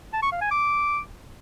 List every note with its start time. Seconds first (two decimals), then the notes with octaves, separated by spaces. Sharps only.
0.13 A5
0.23 C#6
0.32 F5
0.41 G#5
0.51 D6